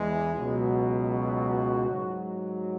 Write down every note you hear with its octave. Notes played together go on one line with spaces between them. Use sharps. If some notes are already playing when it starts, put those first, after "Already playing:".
Already playing: E2 E3 G#3
C#2 B2 F#3
F#4
G#2 F#3